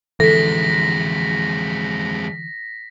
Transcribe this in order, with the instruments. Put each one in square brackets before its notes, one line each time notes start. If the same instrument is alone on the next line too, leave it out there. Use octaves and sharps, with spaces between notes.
[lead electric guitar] F2 G#3 [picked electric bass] D3 E3 [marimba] A4 [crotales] A#6 B6